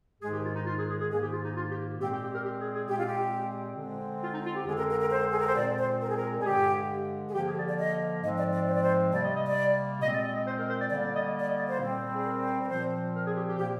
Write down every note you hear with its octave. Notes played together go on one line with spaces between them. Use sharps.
G#2 D#3 G#3 G#4
G4
F4
D#4
F4
G#4
G#4
G#4
G#2 D#3 A#3 G#4
G4
F4
D#4
F4
G4
A#2 G#3 C4 G4
G4
G4
A#4
G4
G#4
G#4
A#2 G#3 C4 G4
F4
G4
D3 G#3 C4
F4
D#4
F4
G4
F2 D3 G#3 C4 G#4
A#4
A#4
A#4
C5
G#4
A#4
C5
A#2 G#3 C4 D5
C5
A#4
G#4
A#4
G#4
G2 D3 G#3 G4
G#4
D3 F3 A#3 G4
G#4
D5
D5
D#5
G#2 F3 G#3 C4 D#5
D5
D5
C5
D5
C5
C3 G3 A#3 D5
D#5
D#5
D5
A#2 G#3 C4 D#5
D5
D#5
D#5
C5
A#4
C5
D5
D3 G3 A#3 D5
D5
D#5
D5
D5
D#5
D5
C5
A#2 G3 C4
G#4
A#4
A#4
A#2 F3 C4 C5
A#4
G#4
G4
G4
A#2 F3 A#3 G4